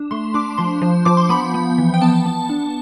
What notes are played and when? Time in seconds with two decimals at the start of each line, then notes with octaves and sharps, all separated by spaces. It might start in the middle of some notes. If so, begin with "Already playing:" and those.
Already playing: D4
0.11 A3 C6
0.34 D4 D6
0.58 F3 C6
0.82 F3
1.05 F3 D6
1.17 C6
1.29 B3 B5
1.54 B3
1.78 E3
1.94 G5
2.01 B3 A5
2.26 B3
2.49 D4